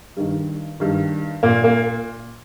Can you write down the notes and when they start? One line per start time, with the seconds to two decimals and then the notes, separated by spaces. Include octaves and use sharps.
0.17 G2 D#3
0.80 G2 D#3
1.43 A#2 A#3
1.64 A#3